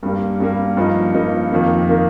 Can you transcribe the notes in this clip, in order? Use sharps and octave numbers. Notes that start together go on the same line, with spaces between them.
G2 G3 A#3
G2 G3 A#3
G2 F3 A#3 D#4
G2 F3 A#3 D#4
F2 D#3 A#3
D#3 A#3